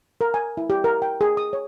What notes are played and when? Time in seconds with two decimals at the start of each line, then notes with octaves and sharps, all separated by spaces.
0.21 A#4
0.34 G#5
0.57 E4
0.70 G4
0.84 A#4
1.02 G5
1.21 G#4
1.37 D#6
1.53 C#5